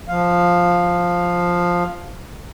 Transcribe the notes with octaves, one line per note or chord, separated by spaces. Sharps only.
F3 F5